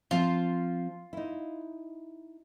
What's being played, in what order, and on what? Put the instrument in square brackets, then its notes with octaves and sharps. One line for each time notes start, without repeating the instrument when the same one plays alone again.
[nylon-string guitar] F3 C4 [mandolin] F4
[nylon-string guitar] D#4 E4